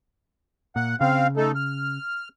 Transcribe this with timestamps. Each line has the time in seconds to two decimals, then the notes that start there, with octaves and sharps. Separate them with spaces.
0.76 A#2 F#5
1.01 C#3 C4 F5
1.37 A3 D#4 A4
1.55 F6